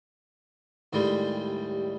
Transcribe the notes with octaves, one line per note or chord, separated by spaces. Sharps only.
D#2 A2 G3 G#3